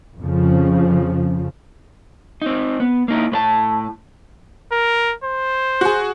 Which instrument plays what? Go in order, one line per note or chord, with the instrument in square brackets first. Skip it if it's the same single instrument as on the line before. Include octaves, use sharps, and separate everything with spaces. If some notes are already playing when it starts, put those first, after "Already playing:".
[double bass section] F2 C#3 F3
[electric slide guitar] C4 D#4
B3
A#3 D#4 E4
A2 B4 A5
[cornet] A#4
C5
[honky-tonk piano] F#4 G#4